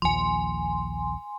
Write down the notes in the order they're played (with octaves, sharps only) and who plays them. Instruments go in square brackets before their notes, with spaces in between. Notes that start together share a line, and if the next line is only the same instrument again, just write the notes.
[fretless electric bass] A#1 D#2 F3 [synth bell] G#5 C6